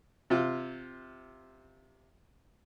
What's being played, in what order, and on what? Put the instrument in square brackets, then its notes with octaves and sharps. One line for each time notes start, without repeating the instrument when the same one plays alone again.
[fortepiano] C3 F4